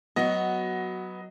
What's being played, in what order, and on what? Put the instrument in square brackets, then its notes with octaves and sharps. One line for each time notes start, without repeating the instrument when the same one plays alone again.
[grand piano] F#3 D#5 [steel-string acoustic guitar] B3 F#4